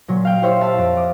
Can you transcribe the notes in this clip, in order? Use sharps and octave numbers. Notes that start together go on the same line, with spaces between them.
A#2 F#3
F5 G5
E4 G4 C5 C#5 E5
E5 F5 A5
F2
D6 D#6